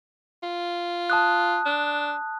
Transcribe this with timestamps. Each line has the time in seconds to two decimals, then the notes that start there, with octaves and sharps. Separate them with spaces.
0.43 F4
1.10 A5 D#6 F#6
1.66 D4